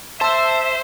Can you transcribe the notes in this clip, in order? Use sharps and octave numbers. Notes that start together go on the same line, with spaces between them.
C5 E5 A5 E6